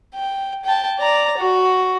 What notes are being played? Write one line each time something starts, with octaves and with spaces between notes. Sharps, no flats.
G5
G5 A5
D5 A#5
F#4